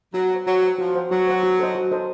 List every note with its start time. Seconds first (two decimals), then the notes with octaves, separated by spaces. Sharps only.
0.14 F#3 F#4
0.30 C5 F#5
0.47 F#3 F#4
0.63 C5 F#5
0.79 F3 F#4
0.95 C5 F#5
1.11 F#3 F#4
1.27 C5 F#5
1.43 F#4
1.59 A4 C5 D#5
1.75 F#4
1.92 A4 C5 D#5